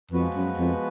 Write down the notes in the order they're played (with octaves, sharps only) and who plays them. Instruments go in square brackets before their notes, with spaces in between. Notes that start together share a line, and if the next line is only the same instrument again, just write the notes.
[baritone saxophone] F2 [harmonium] F3 G#3 B3 F#4 B4
[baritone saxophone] F#2
F2